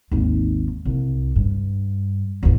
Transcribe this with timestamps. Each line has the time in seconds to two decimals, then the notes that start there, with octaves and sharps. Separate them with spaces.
0.11 G#1 D#2
0.85 C2
1.36 G2
2.43 A1 E2